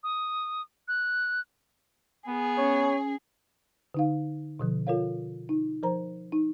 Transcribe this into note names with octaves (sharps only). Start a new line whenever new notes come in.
D#6
F#6
B3 G#4
C#4 C#5
D3 D#4 F5
B2 D3 F3
F4 A4 A#4 C#5 F5
D#4
F3 A#4 C5 A#5
D#4